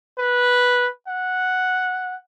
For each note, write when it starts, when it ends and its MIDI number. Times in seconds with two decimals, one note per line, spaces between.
0.18 0.88 71
1.08 2.16 78